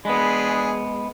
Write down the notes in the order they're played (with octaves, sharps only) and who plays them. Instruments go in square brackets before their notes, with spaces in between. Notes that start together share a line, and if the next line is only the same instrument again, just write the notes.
[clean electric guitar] G#3 B3 [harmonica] D4 G#4 B5